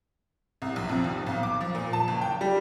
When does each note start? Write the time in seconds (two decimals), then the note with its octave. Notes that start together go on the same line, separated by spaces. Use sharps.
0.62 C2
0.76 A#1
0.89 F2
1.04 D#2
1.27 B1
1.43 D6
1.61 F3
1.75 A#2
1.93 A5
2.08 F#1
2.21 G5
2.41 G3